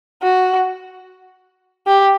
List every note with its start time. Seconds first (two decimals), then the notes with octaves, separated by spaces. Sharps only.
0.23 F#4
1.87 G4